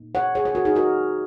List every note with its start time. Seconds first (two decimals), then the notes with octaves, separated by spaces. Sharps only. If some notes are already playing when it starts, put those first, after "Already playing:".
Already playing: A#2 A#3 D#4
0.15 C#5 F#5
0.35 G#4 C#5
0.45 G#4 C#5
0.55 F#4 A#4
0.65 D#4 G#4
0.75 F#4 A#4